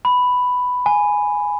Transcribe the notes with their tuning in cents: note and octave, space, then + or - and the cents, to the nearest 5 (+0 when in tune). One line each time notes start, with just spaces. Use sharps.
B5 +5
G#5 +0